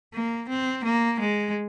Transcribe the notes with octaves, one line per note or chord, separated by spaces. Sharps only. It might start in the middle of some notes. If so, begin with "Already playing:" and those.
A#3
C4
A#3
G#3